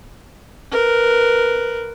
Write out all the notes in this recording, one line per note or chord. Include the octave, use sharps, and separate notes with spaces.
A#4 B4